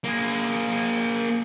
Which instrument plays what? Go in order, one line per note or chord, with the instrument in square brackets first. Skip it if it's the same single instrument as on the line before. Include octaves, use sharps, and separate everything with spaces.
[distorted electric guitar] A#3 G#4